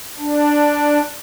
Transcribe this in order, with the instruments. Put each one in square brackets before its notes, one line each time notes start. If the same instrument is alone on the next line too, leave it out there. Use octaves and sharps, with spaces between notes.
[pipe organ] D4